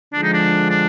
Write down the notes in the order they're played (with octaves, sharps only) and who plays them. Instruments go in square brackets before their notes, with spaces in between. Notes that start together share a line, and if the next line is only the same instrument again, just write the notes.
[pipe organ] D3 F3 G#3 [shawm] D4
[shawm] D#4
D4
D4